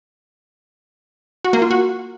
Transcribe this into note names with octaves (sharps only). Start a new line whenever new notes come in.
F#4
A#3
F4
F#4